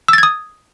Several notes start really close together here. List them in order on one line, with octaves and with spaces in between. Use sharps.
E6 A6 G#6 D#6